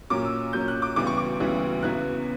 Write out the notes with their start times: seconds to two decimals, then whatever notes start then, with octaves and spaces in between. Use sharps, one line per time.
0.10 A#2 F#3 C#4 D6
0.25 E6
0.53 A#2 F#3 C#4 G6
0.68 F#6
0.82 D6
0.96 D2 C#3 E3 G3 B3 D6
1.07 C#6
1.17 D6
1.40 D2 C#3 E3 G3 B3
1.83 E2 C#3 F#3 B3 E4 F#6